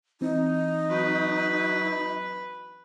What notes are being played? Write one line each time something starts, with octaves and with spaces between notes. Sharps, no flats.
E3 C4 D#4
F#3 B4